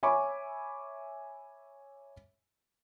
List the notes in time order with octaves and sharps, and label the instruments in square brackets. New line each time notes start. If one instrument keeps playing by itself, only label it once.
[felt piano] C#5 E5 G#5 B5 C#6 D6